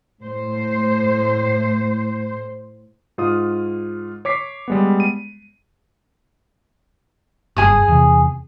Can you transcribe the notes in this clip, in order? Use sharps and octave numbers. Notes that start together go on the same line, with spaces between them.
A2 C5
G#2 F4 D#6
C#5 D6 B6 C7
G3 G#3 B3
D#7
F#1 G2 G#4 G#5 D#6
E2 C3